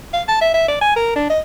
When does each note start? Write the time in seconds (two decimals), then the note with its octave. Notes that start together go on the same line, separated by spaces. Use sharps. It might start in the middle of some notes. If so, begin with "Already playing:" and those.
0.13 F5
0.28 A5
0.41 E5
0.54 E5
0.68 D5
0.81 G#5
0.96 A#4
1.16 D4
1.30 D#5